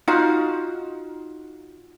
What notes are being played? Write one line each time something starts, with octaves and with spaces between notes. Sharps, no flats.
D#4 F4 F#4 F5